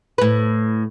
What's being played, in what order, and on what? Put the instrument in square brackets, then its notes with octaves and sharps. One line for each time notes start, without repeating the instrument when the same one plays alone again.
[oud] A2 B4